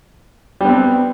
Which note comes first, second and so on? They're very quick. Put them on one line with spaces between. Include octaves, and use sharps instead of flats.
G3 B3 C4